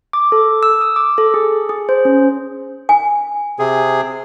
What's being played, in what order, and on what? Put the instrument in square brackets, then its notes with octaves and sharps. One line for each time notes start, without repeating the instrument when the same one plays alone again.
[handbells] D6
A4
E6
D#6
D6
A4
G#4
G#4
C5
C#4
[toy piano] G#5
[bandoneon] C3 G#4